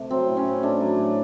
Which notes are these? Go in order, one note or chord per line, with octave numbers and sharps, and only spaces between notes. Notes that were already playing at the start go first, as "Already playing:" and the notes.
Already playing: C3 A3
F#3 C4
A2
C#4
A2
A3 D4
F#3
A2